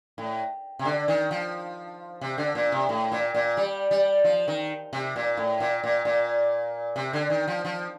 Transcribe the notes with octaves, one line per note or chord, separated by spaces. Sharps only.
A2
C3
D3
D#3
F3
C3
D3
A#2
C3
A2
A#2
A#2
G3
G3
F3
D#3
C3
A#2
A2
A#2
A#2
A#2
C3
D3
D#3
F3
F3